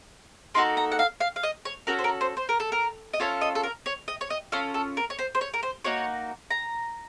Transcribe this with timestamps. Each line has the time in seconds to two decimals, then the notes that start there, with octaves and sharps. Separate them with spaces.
0.54 A#3 D#4 F#4 A4 C6
0.77 A#5
0.92 F#5
0.99 F5
1.20 F5
1.36 F5
1.43 D#5
1.65 C#5
1.87 C#4 F#4 A4 A#4
1.99 C5
2.04 A#4
2.21 C5
2.37 C5
2.49 A#4
2.60 A4
2.72 A#4
3.13 D#5
3.20 C#4 F4 A4 C#5
3.41 D#5
3.55 A4
3.63 A#4
3.86 C#5
4.08 D#5
4.21 C#5
4.30 D#5
4.52 C#4 F4 A4 F5
4.74 A4
4.97 A#4
5.10 C#5
5.19 C5
5.35 C5
5.41 C#5
5.54 A#4
5.63 C5
5.84 A#3 D#4 F#4 C#5
6.50 A#5